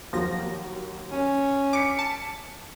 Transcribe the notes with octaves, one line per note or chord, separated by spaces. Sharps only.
D#2 F3 F#3 A#6
C#4
D6 B6 C#7 D7
A5